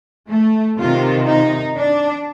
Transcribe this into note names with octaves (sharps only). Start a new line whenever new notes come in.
A3
C3 D#3 F4
D#4
D4